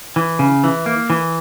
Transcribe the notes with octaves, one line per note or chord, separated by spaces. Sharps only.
E3
C#3
E3
A#3
E3